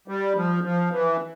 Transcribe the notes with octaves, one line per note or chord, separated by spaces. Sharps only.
G3
F3
F3
E3